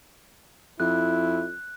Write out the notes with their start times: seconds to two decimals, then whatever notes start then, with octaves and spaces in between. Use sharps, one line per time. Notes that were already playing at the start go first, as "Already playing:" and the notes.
0.80 F2 E4 F#6